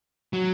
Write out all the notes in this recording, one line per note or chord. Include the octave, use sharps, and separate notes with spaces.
F#3